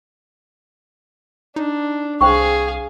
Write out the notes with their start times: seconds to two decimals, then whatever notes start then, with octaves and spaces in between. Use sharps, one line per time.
1.56 D4 D#4
2.21 C2 G#4 C5 F5 G5 C#6